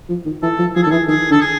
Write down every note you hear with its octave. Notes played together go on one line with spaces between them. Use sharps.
F3
D#3
E3 A4
F3
F3 G#4
A4
D#3
E3 G#4
D#3 G#4
D3 A4
G#4